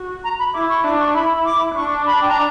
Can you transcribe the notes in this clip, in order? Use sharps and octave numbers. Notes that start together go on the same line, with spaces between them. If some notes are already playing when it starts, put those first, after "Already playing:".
Already playing: F#4
A#5
B5
E4 D6
C#6
D4 D6
C#6
E4 B5
D6
D4 C#6
B5
G5
A#5